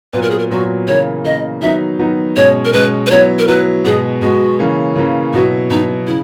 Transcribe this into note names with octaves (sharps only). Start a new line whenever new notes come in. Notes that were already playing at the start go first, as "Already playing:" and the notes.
A#2 F#3 B3 B4
A#4
G#4
A#4
A#2 F#3 B3 F#4
C#3 E3 A#3 C#5
C#3 E3 A#3 D#5
D#3 F#3 B3 D#4 E5
D#3 F#3 B3 D#4
B2 G#3 C#4 C#5
A#4
B2 G#3 C#4 B4
B4
F#3 B3 E4 C#5
A#4
F#3 B3 E4 B4
B2 G#3 B3 G#4
B2 G#3 B3 F#4
C#3 E3 A#3 C#4
C#3 E3 A#3 C#4
B2 F#3 B3 E4 F#4
B2 F#3 B3 D#4 E4
C#3 E4